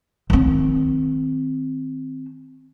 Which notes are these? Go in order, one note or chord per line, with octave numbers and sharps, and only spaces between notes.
D#3 C4